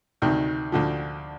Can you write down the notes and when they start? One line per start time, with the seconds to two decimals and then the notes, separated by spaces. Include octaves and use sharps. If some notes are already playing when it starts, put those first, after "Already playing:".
0.22 D2 C3 D#3
0.72 D2 D3 F3